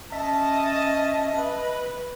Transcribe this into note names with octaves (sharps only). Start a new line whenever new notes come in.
C#4 D#5 E5 A5
B4